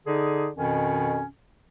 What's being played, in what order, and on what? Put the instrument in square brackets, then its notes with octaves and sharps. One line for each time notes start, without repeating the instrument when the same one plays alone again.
[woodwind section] D3 D#4 G#4 D5
F2 B2 D#3 C#4